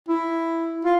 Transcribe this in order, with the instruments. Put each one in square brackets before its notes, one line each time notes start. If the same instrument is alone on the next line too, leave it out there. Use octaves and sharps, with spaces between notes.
[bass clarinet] E4
F4